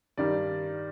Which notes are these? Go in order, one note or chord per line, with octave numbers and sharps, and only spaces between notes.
G2 D#3 G3 D5